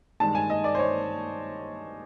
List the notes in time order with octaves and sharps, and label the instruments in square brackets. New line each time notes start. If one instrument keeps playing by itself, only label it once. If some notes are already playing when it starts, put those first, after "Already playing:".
[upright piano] G2 D#3 G#3 A5
G#5
D#5
D5
C5
C#5